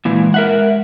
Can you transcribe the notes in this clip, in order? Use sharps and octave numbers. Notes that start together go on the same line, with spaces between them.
A#2 E3 G#3
A#4 E5 F#5